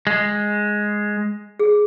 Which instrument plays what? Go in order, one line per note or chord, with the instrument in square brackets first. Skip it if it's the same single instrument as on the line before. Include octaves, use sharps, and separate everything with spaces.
[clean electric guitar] G#3
[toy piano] G#4